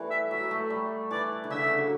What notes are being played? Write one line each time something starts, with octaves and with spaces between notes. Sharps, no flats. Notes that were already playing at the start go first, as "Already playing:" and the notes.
Already playing: E3 G3 A3
E5
F#3 E5
A3
G3
E3 D5
D3
C#3 E5
D3
F#3